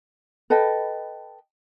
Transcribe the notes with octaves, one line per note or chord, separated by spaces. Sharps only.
A4 B4 D#5 G5